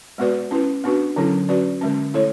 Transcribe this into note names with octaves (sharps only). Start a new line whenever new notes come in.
G#3 B3 F#4 B4 D5
C#4 E4 B4
B3 D4 F#4 B4
D3 F#3 C#4 E4 A4
C#4 F#4 B4 D5
D3 G#3 C#4
A3 E4 A4 C#5